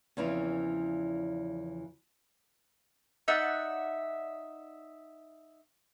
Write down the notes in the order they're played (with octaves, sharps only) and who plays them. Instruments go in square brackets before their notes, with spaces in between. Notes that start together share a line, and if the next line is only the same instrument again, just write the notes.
[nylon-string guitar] E2 C#3 E3 F3 C4 E4
[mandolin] D#4 D5 E5 F#5